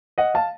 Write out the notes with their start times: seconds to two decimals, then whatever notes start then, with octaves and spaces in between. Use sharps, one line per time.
0.18 D#5 F#5
0.34 F5 A5